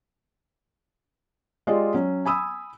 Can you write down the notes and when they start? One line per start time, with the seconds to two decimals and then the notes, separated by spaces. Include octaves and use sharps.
1.67 G#3 F4 G4 D5 D#5
1.94 F#3 C#4
2.26 G#5 B5 D#6 E6